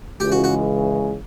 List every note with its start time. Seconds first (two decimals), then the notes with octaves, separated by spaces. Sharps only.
0.20 C#2 C#3 E3 G#3 G4
0.32 F#4
0.44 F#4